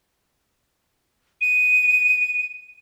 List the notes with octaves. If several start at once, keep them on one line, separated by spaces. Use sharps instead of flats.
D#7